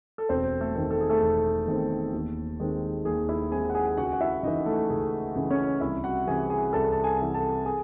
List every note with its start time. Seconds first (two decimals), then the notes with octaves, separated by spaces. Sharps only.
0.18 A4
0.29 E1 C4 C5
0.61 A3 A4
0.75 E2 D#3 A3 C4
0.91 A4
1.01 G#4
1.10 A3 A4
1.21 E1
1.67 E2 D#3 A3 C4
2.13 D#2
2.60 D#3 G#3 C4
3.05 D#2 G#4
3.29 E4 E5
3.51 D#3 G#3 C4 G#4 G#5
3.70 F#5
3.75 G#4 G#5
3.86 G#5
3.98 C#2 F#4 F#5
4.06 G#5
4.13 F#5
4.21 E4 E5
4.43 C#3 E3 D#4 D#5
4.66 A3 A4
4.90 C#2 G#4
5.36 C#3 E3
5.50 C#4 C#5
5.81 C2 E4 E5
6.04 F#4 F#5
6.27 C3 E3 G#4 G#5
6.50 G#4 G#5
6.73 C2 A4 A5
6.92 A5
7.04 G#4 G#5
7.19 C3 E3
7.34 A4 A5
7.65 G#4 G#5